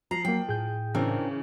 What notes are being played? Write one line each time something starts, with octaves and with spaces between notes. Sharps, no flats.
F3 A#5 C7
F#3 A#3 G5
A2 G#4 G6
C#3 E3 C4 D4 A#4